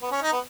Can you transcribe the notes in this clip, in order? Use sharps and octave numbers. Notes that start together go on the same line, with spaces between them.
B3
C#4
D#4
B3